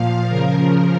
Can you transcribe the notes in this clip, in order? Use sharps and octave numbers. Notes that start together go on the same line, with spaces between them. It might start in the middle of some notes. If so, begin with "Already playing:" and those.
Already playing: A#2 F3 F5
C#3 F3 A#4